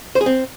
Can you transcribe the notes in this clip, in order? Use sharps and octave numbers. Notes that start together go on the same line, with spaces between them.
C5
G#4
C4